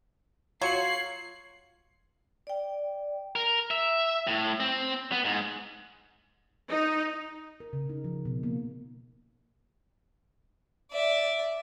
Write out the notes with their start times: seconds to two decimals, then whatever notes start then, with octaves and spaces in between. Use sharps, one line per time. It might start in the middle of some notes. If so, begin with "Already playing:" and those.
0.61 F#3 F4 G#6 C7 C#7 F#7
2.47 D5 G5
3.35 A#4
3.71 E5
4.27 A2
4.60 C4
5.12 B3
5.25 G#2
6.70 D#4
7.60 A#4
7.73 C#3
7.89 D#4
8.04 F3
8.25 B2
8.43 A#3
10.91 D5 E5